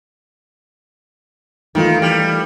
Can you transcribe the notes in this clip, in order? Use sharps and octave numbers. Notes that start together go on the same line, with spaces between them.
D#3 E3 A3 F4
G3